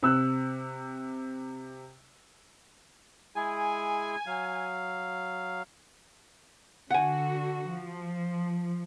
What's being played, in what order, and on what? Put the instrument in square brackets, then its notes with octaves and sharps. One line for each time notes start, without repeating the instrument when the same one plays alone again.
[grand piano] C3 E6 F#6
[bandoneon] G#3 E4 G#4 [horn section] G#5
[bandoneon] F#3 F5
[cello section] D3 F#4 [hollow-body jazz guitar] F#5 G#5
[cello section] F3